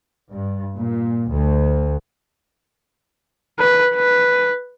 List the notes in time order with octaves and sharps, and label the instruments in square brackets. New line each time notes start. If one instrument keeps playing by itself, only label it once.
[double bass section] G2
A#2
D2
[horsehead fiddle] B4
B4